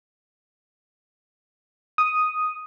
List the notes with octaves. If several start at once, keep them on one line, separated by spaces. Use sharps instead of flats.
D#6